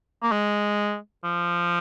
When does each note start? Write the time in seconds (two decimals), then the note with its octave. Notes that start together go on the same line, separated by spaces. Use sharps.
0.22 A#3
0.32 G#3
1.24 F3